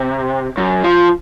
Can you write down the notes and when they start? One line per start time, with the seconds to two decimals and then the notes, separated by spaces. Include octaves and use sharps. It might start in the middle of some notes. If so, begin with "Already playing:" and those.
Already playing: C3
0.58 F#2
0.84 F3